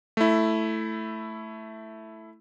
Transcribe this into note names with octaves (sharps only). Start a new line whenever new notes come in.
A3 E4